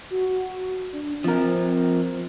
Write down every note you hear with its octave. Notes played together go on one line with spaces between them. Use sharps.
F#4
D4
F3 C4 A#4